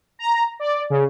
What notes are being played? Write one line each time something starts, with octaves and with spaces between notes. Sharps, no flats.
A#5
D5
C#3